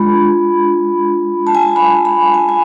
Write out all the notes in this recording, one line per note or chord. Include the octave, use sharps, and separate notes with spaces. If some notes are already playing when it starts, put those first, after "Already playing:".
Already playing: G#3 D4 F4 B5
A5
G#5
A5
B5
B5
G#5
G#5